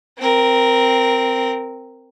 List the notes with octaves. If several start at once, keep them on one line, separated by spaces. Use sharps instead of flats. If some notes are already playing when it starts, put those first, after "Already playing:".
C4 A#4